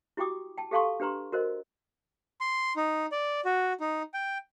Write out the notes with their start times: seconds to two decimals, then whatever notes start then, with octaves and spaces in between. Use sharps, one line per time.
0.17 E4 F#4 G4 G5 D6 D#6
0.57 G5 A5
0.71 G4 A4 F5 A5 C6 C#6
1.00 D4 G4 B4 A#5 C6
1.32 F#4 A#4 C5 D#5
2.41 C6
2.76 D#4
3.12 D5
3.45 F#4
3.80 D#4
4.14 G5